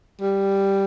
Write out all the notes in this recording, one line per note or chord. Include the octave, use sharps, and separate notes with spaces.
G3